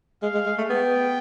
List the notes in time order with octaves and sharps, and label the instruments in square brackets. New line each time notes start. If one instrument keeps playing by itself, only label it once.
[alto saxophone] G#3 [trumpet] F5
[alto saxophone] G#3
G#3
A3
[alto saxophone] B3 [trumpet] G5